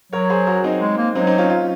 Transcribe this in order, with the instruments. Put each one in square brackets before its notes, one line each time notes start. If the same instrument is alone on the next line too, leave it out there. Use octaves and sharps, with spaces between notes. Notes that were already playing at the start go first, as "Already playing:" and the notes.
[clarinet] F#3 [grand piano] A#4 C#5
[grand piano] G#4 C5
F#4 A#4
C4 D#4
[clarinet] G#3
A#3
[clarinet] F#3 [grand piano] C4 D#4
[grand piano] C4 D#4
C#4 F4
C#4 F4